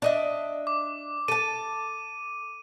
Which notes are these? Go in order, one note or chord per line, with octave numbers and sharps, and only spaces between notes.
D4 D#5 E5
D6
A4 A5 D#7